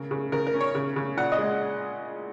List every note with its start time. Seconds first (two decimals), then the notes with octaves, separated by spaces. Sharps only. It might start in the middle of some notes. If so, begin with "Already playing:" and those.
Already playing: C#3 A#4
0.11 C#3
0.32 C#3 A#4
0.47 A#4
0.54 C#4
0.61 C#5
0.75 C#3
0.96 C#3
1.17 A#2 F#5
1.32 D#5
1.38 G#3